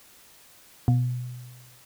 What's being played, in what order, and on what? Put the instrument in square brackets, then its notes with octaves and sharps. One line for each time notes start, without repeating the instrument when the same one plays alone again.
[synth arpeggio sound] B2